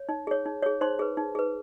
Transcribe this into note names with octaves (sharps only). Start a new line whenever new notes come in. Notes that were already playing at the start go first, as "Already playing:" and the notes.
Already playing: C#5
D#4
G#4 C#5
D#4
G#4 C#5
D#4 C5 C6
G#4 B4
D#4
G#4 B4